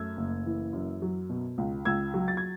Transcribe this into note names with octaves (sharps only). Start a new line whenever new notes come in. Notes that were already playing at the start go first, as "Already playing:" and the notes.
Already playing: F#2 A3 E6 G#6
F#1
E3
F#2
F#3
B2
C#2
C#2 E6 G#6
F#3
A6
G#6